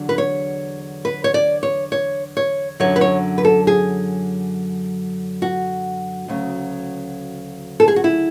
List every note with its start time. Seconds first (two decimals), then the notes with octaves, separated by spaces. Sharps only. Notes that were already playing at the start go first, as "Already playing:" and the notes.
Already playing: E2 D3 F#3
0.09 B4
0.18 C#5
1.05 B4
1.24 C#5
1.34 D5
1.63 C#5
1.92 C#5
2.37 C#5
2.80 F#2 D3 F#3 C#5
2.96 B4
3.01 C#5
3.38 B4
3.45 A4
3.67 G#4
5.42 F#4
6.28 D2 C#3 F#3
7.80 A4
7.88 G#4
7.96 F#4
8.04 E4